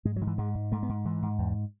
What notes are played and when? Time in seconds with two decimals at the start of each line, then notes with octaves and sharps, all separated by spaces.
0.05 G#2 G#3
0.16 F#3
0.21 G#2 D#3
0.27 E3
0.38 G#2 G#3
0.55 G#2
0.72 G#2 A3
0.83 B3
0.89 G#2
1.05 G#2 E3
1.22 G#2
1.38 E2